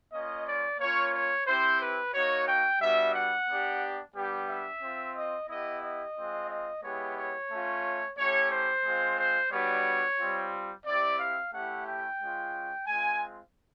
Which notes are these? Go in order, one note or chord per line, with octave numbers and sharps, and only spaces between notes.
A#3 C#4 F4 D#5
D5
A#3 C#4 F4 C#5
C#5
C4 E4 G4 C5
B4
A#3 D#4 F#4 C#5
G5
G3 B3 D4 F#4 E5
F#5
B3 D4 G4
G3 B3 D4 G4
E5
C4 F4
D#5
B3 E4 G4 D#5
D#5
G#3 C4 F4
D#5
G#3 B3 E4 G4 C#5
C#5
A3 C#4 F4
A3 C#4 E4 G4 C#5
C5
G#3 C4 F4
C5
G3 B3 D4 F#4 C#5
G3 C4 F4
C4 E4 G4 D5
F5
A3 C#4 E4 G4 F#5
G5
G#3 C#4 F4
G#3 C4 F4 G#5